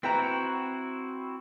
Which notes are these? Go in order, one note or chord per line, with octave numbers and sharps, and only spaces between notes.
C4 E4 F#4 B4 G5 A#5